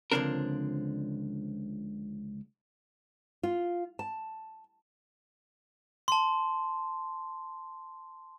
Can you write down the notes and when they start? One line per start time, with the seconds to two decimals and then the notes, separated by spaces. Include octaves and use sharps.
0.12 C#2 D3 F3 C4 D4 A#4
3.43 F4
3.99 A5
6.08 A5 C6